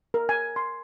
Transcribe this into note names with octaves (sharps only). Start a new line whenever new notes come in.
A#4
G#5
C6